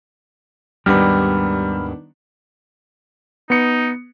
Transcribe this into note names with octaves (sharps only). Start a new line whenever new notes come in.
D#2 G#2 D#3 G3 B3 D4 B5 F6
B3 D#4 C#7